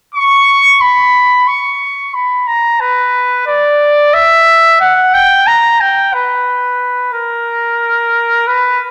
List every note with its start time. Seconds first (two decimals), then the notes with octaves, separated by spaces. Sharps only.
0.14 C#6
0.81 B5
1.48 C#6
2.14 B5
2.47 A#5
2.81 B4
3.47 D5
4.14 E5
4.80 F#5
5.14 G5
5.47 A#5
5.81 G5
6.14 B4
7.13 A#4
8.47 B4